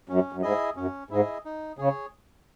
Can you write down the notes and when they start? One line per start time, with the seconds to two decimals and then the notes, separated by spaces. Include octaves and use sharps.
0.09 F#2 C#4
0.33 F#2
0.42 G#2 E4 G#4 D#5
0.76 F#2 C#4
1.11 G#2 E4 G#4 D#5
1.45 D#4
1.78 C#3 G#4 C#5